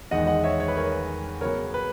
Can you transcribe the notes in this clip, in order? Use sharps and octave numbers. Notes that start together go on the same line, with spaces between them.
E2 D#3 G#3 D#5 F#5
D#5 F#5
C#5 E5
C#5
B4
A#4 C#5
C#3 F#3 B3 A#4 C#5
B4